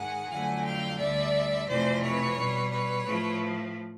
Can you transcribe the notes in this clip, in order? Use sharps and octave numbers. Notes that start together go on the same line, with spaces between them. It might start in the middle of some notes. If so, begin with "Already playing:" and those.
Already playing: G#2 D#3 G#3 F#5 G#5
F2 D3 F#3 A3 F#5 G#5
F5 G5
D2 D3 G3 D5 E5
F2 C3 E3 A3 C5 D5
B4 C#5
B2 G3
B4 C#5
A2 F3 A3